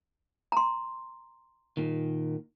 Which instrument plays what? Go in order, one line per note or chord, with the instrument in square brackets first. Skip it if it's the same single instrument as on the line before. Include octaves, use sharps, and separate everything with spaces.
[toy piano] A#5 C6
[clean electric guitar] A#2 D#3